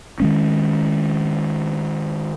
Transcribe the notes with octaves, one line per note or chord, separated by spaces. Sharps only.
D#3 G#3 C#4